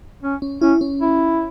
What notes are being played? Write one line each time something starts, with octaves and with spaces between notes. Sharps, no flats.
C#4
C#4
C#4 E4
C#4
E4